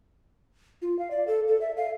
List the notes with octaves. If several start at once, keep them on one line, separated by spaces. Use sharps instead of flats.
F4
F5
D5
A4
A4
E5
F5